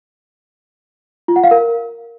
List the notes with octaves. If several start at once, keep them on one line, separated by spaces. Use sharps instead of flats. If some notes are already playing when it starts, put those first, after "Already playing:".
F4
F#5
F5
A#4